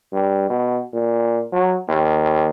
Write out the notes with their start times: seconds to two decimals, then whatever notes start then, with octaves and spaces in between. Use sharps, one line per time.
0.13 G2
0.49 B2
0.93 A#2
1.53 F#3
1.88 D#2